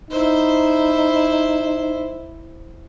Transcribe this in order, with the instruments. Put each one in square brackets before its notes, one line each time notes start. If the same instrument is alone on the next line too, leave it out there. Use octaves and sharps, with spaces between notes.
[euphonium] D#4 [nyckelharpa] E4 C5